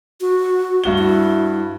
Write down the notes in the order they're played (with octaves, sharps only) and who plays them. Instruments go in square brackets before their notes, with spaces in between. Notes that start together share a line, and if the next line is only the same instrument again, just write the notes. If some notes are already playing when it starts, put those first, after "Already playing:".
[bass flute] F#4
[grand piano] G2 F#4 G7
[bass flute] E4